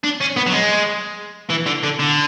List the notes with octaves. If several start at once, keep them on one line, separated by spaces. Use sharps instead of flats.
D4
C#4
B3
F#3
G#3
E3
D3
D3
D3